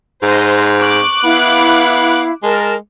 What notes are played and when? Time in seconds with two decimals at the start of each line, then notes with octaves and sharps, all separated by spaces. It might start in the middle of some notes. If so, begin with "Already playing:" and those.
0.23 G#2 C5 D#5
0.80 C#6 D6 F#6 D7
1.24 B3 E4 F5
2.43 G#3 A#4 A5